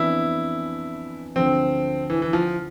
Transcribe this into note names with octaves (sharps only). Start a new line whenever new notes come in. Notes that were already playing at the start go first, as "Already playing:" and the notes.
Already playing: F2 E3 B3 D4 E4
D2 D3 F3 C4
E3
E3
F3